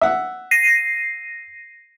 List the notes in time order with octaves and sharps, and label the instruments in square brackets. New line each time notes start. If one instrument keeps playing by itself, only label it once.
[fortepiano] E5 F#5
[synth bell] A#6 C7 D#7